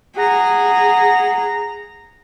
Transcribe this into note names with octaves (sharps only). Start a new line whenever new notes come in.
G#4 F#5 A#5